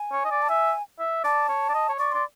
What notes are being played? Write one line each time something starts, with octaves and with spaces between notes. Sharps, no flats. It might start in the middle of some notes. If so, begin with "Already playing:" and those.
Already playing: G#5
C#5
D#5
D5
A5
E5 G#5
E5
D5 A5
C#5
D5
D#5
C#5
D5 C#6
D5 C6